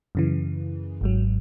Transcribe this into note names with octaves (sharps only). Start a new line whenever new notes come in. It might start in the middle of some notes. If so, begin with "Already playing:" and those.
F#2 C#3 E3
G#1 G#2 F#3